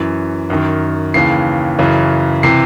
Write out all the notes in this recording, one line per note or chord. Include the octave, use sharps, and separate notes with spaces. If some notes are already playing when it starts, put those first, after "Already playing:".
Already playing: F#2 E3
F#2 D#3
D#2 C#3 E3 C7
F#2 C#3 E3
C3 E3 C7